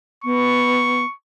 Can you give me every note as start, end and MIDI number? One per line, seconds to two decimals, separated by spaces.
0.24 1.04 59
0.24 1.14 85